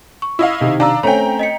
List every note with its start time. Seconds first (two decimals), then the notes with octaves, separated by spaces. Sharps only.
0.22 C#6
0.39 E4 D#5 F5
0.60 C3 D#3
0.80 D4 F5 A#5 E6
1.03 A3 C4 C#4 C#5 G5 G#5 A#5
1.39 D#5 B6 C#7